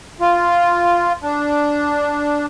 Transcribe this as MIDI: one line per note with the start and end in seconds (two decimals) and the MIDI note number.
0.20 1.13 65
1.23 2.46 62